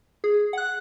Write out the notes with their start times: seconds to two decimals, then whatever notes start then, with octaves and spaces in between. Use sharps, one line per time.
0.24 G#4
0.53 F#5 F#6